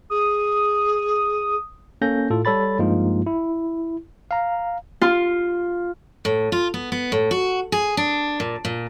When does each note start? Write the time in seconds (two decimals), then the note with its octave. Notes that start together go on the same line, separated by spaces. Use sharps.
0.10 G#4 D#6
2.02 A#3 C#4 A4 G6 A#6
2.30 A2 F4 A4
2.45 G3 A4 C#5 B5 A6
2.79 G2 F3 G#3 A#3 D#4 F4
3.26 E4
4.31 F5 A#5
5.01 F4
6.25 A2
6.52 F4
6.74 B3
6.92 B3
7.12 A2
7.31 F#4
7.72 G#4
7.97 D4
8.40 A#2
8.65 A#2